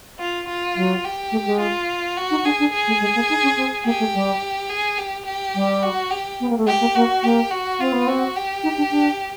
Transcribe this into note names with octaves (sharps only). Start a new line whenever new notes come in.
F4
F4
F#3
G4
A3
G#3
F4
F#4
D#4
D4 G#4
D4
G#4
A3
G#3
A#3
D#4
C#4
C4
A#3 G4
A3
G3
G#4
G4
G4
G3
F#4
G4
B3
A#3
A3
G#3 G4
A#3
A#3 F#4
A#3 G4
F#4
C4 F4
B3
C4 F#4
G4
D#4
D4
D4